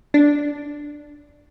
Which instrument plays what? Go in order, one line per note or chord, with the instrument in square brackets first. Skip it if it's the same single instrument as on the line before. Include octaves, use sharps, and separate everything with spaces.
[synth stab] D4